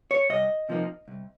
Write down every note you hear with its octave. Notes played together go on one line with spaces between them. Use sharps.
C#5
C2 D#5
C3 F3 A#3 D#4
C2